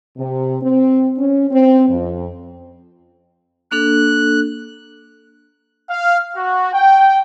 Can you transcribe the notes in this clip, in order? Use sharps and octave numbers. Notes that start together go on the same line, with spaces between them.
C3
C4
C#4
C4
F2
A#3 D4 A4 F#6
F5
F#4
G5